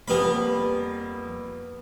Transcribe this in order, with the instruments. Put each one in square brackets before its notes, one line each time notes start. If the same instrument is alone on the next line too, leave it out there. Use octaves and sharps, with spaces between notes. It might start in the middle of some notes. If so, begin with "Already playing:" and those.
[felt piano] F2 G3 A#3 [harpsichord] B3 B5